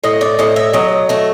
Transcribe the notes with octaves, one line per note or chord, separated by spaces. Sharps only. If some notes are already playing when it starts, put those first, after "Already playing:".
A2 D#5
D5
A2 D#5
E5
F#3 D#5
A3 D#5